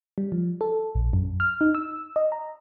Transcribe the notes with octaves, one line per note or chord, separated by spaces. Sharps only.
G3
F3
A4
A#1
F#2
F6
D#4
E6
D#5
A#5